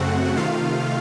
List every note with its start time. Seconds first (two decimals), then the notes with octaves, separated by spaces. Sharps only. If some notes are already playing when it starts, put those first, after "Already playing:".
Already playing: F#2 C#3 A3 C4 F#4 F#5
0.36 C3 D#3 A3 F4 F5